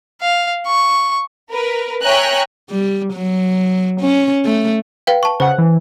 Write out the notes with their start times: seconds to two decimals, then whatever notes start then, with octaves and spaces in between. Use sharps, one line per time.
0.22 F5
0.67 C#6
1.51 A#4 B4
2.03 C#5 E5 G5 G#5 A#5 F#6
2.70 G3
3.14 F#3
4.01 C#4
4.45 A3
5.07 B4 F5 G5
5.23 A5 C#6
5.40 C#3 C5 F#5
5.58 E3